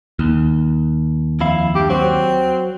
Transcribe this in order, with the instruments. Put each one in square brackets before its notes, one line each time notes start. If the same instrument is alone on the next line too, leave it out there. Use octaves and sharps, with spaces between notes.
[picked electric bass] D#2
[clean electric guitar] F2 E4 F5
[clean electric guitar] G2 [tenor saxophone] G4
[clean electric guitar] F#3 F#4 [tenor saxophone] C4